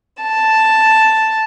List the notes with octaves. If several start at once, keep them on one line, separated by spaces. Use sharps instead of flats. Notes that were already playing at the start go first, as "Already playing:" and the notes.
A5